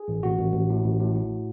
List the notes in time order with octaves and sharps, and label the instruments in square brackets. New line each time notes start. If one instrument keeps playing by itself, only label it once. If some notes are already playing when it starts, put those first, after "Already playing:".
Already playing: [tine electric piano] G#4
A1
A1 F#4
A1
A1
A2
A1
A2
A2